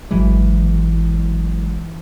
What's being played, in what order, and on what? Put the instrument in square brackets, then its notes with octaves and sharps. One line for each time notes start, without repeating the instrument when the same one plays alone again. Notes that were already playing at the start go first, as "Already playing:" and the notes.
[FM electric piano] G#1 F#3 G#3 [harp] E3